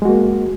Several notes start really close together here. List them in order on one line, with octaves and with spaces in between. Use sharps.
G#3 F#4 A#3